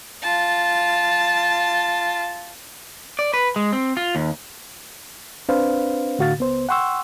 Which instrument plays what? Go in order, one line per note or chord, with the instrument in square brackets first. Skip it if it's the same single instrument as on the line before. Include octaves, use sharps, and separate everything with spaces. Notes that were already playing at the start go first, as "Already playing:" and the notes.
[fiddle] F4 A5
[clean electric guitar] D5
B4
G#3
C4
F4
D#2
[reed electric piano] C4 D4 B4 C5 F5
A2 D3 F#4 F5 A6
C#2 B3 C5
F#5 G5 C6 C#6 E6